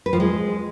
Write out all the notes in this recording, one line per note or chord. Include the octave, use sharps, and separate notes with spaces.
B4
F3
G#3